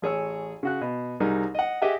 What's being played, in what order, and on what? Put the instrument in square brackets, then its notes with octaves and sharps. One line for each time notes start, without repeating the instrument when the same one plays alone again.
[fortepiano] A1 G#4 C#5 E6
C#3 F#4 F#6
B2
C2 G3 D#4 G#4 A#4
D#5 F#5
G4 G#4 D#5 E5 F#5